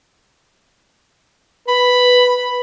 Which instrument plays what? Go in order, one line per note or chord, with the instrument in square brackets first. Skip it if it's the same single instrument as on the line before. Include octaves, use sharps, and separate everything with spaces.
[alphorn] B4 [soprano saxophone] B5